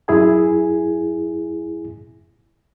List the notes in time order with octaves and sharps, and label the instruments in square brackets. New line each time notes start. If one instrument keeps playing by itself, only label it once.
[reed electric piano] F#2 E4 G#4 G#5